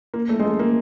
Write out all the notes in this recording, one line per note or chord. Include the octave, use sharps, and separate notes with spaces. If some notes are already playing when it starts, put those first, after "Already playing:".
A#3
A3
G#3
A3
A#3